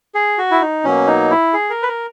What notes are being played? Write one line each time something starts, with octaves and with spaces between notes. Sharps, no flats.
G#4
F#4
E4
D#4
B2 F#3 A#3 C#4
D#4
E4
G#4
A#4
B4
A#4